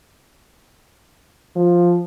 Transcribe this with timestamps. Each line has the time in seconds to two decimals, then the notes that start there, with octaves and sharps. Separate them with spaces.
1.56 F3